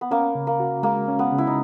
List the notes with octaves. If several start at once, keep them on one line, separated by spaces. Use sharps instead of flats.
B3
A#3 C#4
C#3
A#3
F#4
G#3 A#3
C#4
B3
C#3
E4
D#4